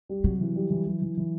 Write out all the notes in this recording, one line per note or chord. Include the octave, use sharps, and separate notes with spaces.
G3
C3 F#3
E3
G3
E3
E3
E3
E3